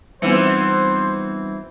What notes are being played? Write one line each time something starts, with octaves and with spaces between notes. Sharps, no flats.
E3 G3 B3 C4 D#4 F4 C5 C#7